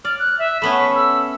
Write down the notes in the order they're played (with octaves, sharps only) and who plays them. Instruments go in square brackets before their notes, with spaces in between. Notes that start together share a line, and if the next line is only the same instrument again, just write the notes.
[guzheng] D5 [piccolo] F6
[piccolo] F#6
E5
[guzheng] A3 B3 C#4 [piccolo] B5
[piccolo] E6